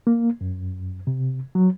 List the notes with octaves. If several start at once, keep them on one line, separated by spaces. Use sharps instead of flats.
A#3
F#2
C3
F#3